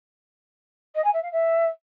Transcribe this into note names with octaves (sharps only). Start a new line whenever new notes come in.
D#5
G#5
E5
F5
E5